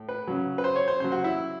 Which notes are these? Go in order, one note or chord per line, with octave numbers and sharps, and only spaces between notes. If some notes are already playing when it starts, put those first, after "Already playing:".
Already playing: A2
B4
C#3 F#3
B4
C5
C#5
C5
C#3 F#3 C5
F#4
E4